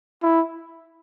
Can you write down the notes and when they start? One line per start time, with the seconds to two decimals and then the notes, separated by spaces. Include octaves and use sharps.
0.23 E4